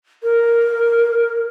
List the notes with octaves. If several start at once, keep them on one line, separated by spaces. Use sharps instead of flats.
A#4